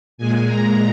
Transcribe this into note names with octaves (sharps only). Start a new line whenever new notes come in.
A#2 G#3 G#5
A#5